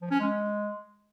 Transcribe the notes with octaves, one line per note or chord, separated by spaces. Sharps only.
F3
C#4
G#3